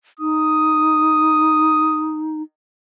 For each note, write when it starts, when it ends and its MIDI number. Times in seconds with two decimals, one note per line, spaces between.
0.20 2.42 63
0.20 2.23 87